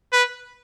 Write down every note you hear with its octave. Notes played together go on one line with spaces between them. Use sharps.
B4